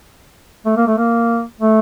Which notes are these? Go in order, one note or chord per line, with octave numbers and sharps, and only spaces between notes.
A3
A#3
A3
A#3
A3